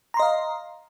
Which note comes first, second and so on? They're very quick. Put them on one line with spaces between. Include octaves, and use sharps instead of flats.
A#5 C6 D#5 F5